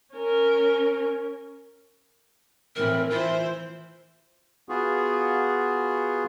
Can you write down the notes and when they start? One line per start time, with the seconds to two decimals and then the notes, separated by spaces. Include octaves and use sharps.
0.15 C#4 A#4
2.76 A2 E3 C4 A#4
3.11 E3 E4 F4 C5
4.69 B3 F4 F#4 G#4